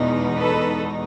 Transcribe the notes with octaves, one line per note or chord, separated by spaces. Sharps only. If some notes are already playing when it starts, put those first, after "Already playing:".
Already playing: E2 B2 G#3 B3 D#4
A4 B4